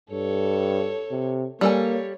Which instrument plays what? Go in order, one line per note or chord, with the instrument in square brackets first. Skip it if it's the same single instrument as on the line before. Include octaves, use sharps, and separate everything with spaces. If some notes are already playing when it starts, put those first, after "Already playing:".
[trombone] G2 [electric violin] A4 C#5
[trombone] C3
[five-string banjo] G3 A4 G#5 [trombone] A#3 [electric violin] C#5